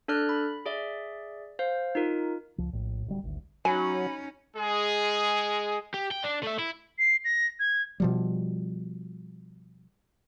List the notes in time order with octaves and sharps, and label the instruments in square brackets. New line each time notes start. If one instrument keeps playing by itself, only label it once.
[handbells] D4 A4 D5 F6 F#6
B5
G#4 D5 E5
C5 F5
D#4 F4 A#4
[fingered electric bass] C#2 F3
A#1 A2
D1 D2 G3
G#1 D2
[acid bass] F#3 [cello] C#4 D#4 [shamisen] G#5 [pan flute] B5
[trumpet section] G#3 G#4
[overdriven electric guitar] G4
G5
D4
A3 E5
E4
[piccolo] C7
A#6
G#6
[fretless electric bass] B2 F3 G3